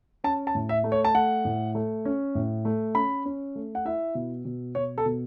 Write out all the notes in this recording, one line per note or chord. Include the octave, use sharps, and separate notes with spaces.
C#4 A5
A5
A2
E5
A3
C#5
A5
A3 F#5
A2
A3
C#4
A2
A3
C#4 B5
C#4
A3
F#5
E4 E5
B2
B2
B2 C#5
A4
B2